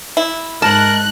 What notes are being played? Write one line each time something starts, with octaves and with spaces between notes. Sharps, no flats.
E4
G#2 A#4 A5 F#6